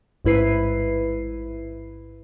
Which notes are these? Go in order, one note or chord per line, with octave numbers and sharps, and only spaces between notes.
A1 G#2 E4 B4 C7